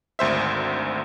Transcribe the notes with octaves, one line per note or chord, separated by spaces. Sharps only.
G#1 D2 C5 E5